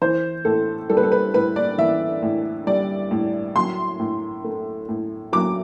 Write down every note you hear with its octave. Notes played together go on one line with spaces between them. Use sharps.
E3 C5
A2 A4
G3 A4
B4
A4
B4
A2 B4
D5
E3 E5
A2
G3 D5
A2
F#3 C6
A2
A3
A2
F#3 D6